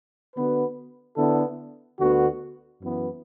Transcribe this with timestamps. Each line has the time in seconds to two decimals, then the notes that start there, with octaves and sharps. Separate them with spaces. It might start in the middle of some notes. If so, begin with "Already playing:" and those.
0.36 D3 B3 F#4 B4
1.17 D3 B3 E4 A4
1.99 D2 D3 B3 F#4
2.81 F#2 E3 B3